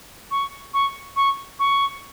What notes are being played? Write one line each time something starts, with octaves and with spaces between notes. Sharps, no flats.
C#6
C#6
C#6
C#6